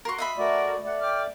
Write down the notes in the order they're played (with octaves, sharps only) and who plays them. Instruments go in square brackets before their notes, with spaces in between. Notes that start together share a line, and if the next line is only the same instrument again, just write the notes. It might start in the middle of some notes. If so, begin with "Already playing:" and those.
[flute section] F#4 F5 C6 [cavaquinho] A#4 C#6
[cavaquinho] D#5 E5 B5
[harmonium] A3 F#4 D5 [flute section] A#4
[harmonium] A3 D5 [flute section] F#5
[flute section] G5 D6 F6